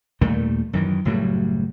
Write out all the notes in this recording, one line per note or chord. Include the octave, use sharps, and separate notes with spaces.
D#2 A#2 G3 A3
F#2 D#3 E3
F#1 A2 F#3 G3